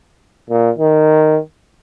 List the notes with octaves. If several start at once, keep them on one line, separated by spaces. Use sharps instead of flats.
A#2
D#3